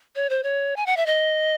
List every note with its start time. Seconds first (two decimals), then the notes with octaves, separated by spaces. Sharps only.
0.16 C#5
0.30 C5
0.43 C#5
0.76 G#5
0.86 F#5
0.97 E5
1.06 D#5